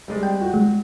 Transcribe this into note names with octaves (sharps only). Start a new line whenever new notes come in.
G3 G#3 D5
G5
F#4
G#3